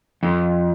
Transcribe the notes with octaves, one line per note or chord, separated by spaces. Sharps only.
F2